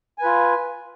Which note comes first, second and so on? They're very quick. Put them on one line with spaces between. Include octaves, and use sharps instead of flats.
G#5 B4 F4